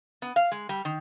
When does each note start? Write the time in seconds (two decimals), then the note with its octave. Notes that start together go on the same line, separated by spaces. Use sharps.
0.22 B3
0.36 F5
0.52 G#3
0.69 G3
0.85 D#3